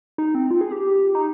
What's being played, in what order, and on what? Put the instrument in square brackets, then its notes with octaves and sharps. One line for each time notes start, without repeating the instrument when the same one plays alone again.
[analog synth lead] D#4
C4
F4
G#4
G4
D#4